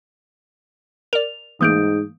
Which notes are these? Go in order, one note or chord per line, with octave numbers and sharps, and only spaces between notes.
A#4 D5 F7
G#2 E3 A3 A#3 D#6 G6 D7